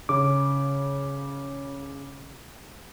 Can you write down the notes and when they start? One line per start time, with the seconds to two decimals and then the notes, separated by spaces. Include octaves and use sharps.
0.09 C#3 D6